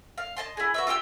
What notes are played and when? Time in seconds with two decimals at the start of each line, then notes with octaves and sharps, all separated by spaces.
0.18 F5
0.37 D#5 A5 C6
0.57 E4 G#4
0.74 F#4 B4 E5
0.87 F4 G4 G5 E6